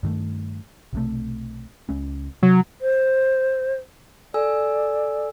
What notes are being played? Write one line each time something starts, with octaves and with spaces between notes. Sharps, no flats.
G2 D#3 A3
B1 C3 A3
C#2 G#3 C#4
C3 F#3
C5
A4 D5 G#5 E6